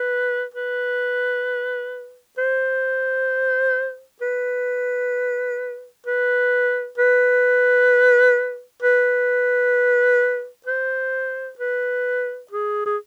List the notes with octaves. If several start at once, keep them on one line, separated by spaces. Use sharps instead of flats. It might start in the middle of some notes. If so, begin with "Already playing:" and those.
Already playing: B4
B4
C5
B4
B4
B4
B4
C5
B4
G#4
G#4